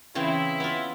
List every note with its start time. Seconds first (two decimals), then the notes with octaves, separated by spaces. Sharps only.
0.15 C#3 E3 C4 E4
0.60 B3 F4